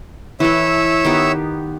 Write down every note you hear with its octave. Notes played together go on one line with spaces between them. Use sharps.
E3 A4 C#5 E5 E6
D#3 B3 G4